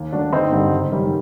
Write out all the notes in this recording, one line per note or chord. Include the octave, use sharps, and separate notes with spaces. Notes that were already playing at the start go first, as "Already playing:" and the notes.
Already playing: D#2
D#3 F#3 A3 D4 F#4
G1 C4 D#4
G2 D3 G3
F#1
F#2 D#3 G3